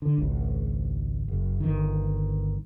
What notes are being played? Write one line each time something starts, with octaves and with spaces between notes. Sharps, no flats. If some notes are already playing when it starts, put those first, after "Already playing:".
D3
G#1 C#2
F#1
G1 D#3